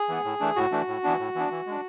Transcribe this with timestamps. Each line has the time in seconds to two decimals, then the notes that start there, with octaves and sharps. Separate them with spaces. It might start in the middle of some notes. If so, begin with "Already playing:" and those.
Already playing: G#4
0.09 E3 B3
0.24 A2
0.40 E3 A3 D4
0.56 A2 F#4
0.72 E3 A3 D4
0.88 A2
1.03 E3 B3 D4
1.19 A2
1.35 E3 B3 D4
1.51 E3
1.66 G#3 D4